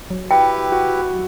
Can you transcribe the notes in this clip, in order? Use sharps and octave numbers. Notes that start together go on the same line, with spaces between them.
F#3
E4 G4 B4 G5
F#4